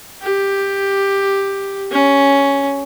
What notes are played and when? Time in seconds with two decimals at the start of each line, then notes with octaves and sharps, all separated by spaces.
0.22 G4
1.92 C#4